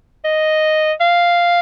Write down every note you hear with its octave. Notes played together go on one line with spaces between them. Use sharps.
D#5
F5